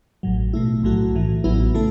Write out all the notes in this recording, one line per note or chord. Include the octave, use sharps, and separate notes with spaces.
A1 A2 F#3
B2 A3 E4
B1 A2 F#3 A3 F#4
B1 A2 E3
A1 A2 F#3 B3 E4
C#3 A3 E4 A4